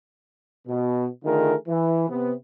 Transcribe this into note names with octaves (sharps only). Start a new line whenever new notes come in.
B2
D3 D#3 A3 F4 G#4 A#4
E3
C3 B3